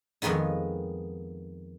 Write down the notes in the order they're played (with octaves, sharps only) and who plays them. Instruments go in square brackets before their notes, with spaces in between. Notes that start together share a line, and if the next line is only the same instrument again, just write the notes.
[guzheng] F2 D#3 G#3 B3 D#4